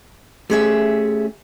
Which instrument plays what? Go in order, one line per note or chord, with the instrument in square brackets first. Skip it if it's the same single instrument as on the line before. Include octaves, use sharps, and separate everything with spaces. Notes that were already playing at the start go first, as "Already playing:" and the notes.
[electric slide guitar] A3 C#4 [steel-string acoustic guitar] G4 G#4 E5